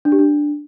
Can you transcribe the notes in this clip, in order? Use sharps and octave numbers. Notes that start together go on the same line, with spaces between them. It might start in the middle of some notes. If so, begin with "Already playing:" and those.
D4
G4
D4